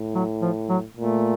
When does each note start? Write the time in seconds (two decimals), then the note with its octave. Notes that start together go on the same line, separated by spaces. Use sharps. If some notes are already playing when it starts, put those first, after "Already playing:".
Already playing: A2
0.15 F#3
0.42 F3
0.69 F#3
0.96 A#2 A3